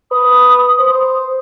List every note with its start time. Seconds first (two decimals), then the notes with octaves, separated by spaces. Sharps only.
0.12 B4 D#6
0.79 C5